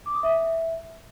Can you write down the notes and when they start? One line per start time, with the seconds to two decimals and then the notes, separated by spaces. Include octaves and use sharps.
0.06 D6
0.14 D#6
0.23 E5